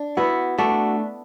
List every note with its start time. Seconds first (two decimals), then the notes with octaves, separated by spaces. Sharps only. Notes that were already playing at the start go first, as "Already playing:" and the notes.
Already playing: D4
0.17 B3 E4 F#4
0.58 A3 D4 F#4